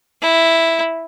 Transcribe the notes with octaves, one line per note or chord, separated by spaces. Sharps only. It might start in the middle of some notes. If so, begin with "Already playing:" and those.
E4